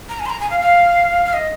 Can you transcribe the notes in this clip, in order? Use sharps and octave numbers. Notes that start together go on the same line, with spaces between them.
A#5
G#5
C6
A#5
G#5
F5
F5
F5
D#5